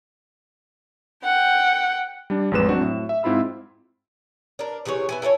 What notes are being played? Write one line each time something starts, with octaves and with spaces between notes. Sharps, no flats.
F#5 G5
G3 D4
A1 F2 G#3 B4 E7
F#3 C4 D4 F#4
A2
E5
G#2 C4 E4 F4 B5 E6
D4 A#4
C3 E3 G#4 C#5
B3 E4 G#5
E4 A4 B4 C#5